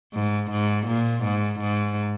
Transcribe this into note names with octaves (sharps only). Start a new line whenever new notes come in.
G#2
G#2
A#2
G#2
G#2